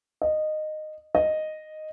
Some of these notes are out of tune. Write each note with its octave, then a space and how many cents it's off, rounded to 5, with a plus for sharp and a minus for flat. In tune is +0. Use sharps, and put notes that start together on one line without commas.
D#5 -15
D#5 -5